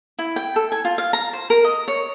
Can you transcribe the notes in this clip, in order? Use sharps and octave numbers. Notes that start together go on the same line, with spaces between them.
E4
G5
A4
G#5
F4
F5
A#5
C5
A#4
D#5
C#5